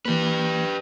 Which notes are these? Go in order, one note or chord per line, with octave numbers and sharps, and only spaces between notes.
E3 A#3 G4 B4